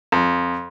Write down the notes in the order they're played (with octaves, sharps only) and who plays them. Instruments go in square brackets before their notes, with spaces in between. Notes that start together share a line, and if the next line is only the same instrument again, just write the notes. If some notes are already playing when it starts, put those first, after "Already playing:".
[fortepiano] F2